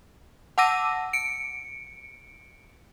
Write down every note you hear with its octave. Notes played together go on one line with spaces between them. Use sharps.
F#5 A5 D6 E6 A#6 D#7
C#7 D7